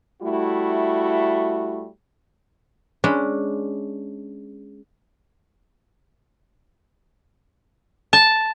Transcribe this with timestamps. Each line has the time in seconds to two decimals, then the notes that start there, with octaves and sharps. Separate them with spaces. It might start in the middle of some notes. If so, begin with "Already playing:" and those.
0.22 G3 A3 E4 F#4
3.04 G#3 C#4 D4 B5
8.13 A5